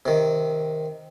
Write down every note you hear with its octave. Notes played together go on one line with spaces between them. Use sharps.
C3 D#3